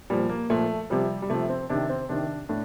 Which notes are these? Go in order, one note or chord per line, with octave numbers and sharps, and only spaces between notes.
A#2 F3 G3
A#3
A#2 F3 A3
C3 F3 G3
G3
C3 F3 A3
C4
C3 D#3 D4
C4
C3 D#3 D4
A2 D4